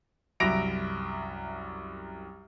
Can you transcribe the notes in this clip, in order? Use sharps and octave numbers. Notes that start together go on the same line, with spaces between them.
C2 F#2 E5 A#6 D7 F7